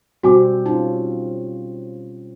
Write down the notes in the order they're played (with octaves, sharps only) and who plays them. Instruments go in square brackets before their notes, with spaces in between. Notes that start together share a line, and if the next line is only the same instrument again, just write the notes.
[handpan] B2 G3 C4 [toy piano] F#4 G#5 D6
[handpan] C#4 F4 [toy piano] D#4